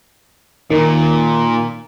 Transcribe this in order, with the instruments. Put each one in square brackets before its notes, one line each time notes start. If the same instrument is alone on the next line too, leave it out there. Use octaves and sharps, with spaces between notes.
[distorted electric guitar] A#2 [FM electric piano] D#3